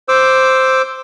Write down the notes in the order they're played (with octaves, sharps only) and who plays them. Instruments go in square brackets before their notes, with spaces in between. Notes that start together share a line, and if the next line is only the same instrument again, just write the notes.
[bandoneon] C5 D6 E6